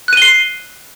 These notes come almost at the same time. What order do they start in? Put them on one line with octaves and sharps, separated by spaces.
F#6 D#7 G7 C7